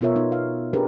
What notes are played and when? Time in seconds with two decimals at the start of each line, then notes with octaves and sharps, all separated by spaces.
0.01 B2 B3 F4 A#4 C#5 E5
0.16 B3 D#4
0.32 F5
0.73 C4 D4 G4 G#4 A#4 B4